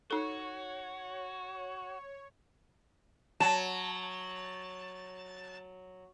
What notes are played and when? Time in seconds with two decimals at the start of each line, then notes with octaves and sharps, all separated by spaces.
0.11 D#4 F#4 A4 C#5
3.40 F#3 A5